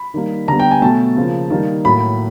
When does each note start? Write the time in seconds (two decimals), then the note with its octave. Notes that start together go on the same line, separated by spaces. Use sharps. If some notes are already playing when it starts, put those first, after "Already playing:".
Already playing: B5
0.14 D#3 G3 A#3
0.48 D3 G3 B3 A#5
0.59 G5
0.71 G#5
0.82 B2 F#3 A3 A5
1.16 C#3 F3 A#3
1.50 D#3 G3 A#3
1.85 A2 F#3 A#3 B5